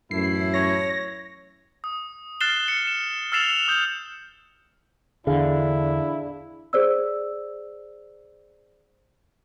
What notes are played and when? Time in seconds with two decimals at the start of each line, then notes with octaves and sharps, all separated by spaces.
0.11 A1 F#2 A3 E4 C7
0.54 C#5 A#6
1.84 D#6
2.41 F6 F#6 A6 C7 E7 G7
2.68 C7 C#7
2.87 E7
3.32 E6 F6 A6 C7 E7 F7
3.68 D#6 G6
5.27 E2 D3 D4 E4 G#4 F5
6.73 G#4 C5 D5 E6